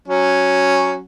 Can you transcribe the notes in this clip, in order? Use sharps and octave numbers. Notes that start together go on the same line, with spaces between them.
F#3 C#4